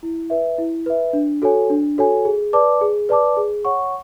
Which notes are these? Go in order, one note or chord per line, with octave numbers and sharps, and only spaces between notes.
E4
B4 E5
E4
B4 E5
D4
F#4 A4 C#5 G#5
D4
F#4 A4 C#5 G#5
G#4
B4 D5 A5 D6
G#4
B4 D5 A5 D6
G#4
C#5 F#5 C#6